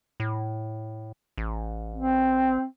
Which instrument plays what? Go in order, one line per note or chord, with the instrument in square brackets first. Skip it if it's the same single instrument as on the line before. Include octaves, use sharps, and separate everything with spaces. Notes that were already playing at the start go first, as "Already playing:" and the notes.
[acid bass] A2
A1
[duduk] C4